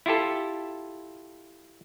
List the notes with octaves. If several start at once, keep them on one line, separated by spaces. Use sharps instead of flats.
E4 F4 G4 A4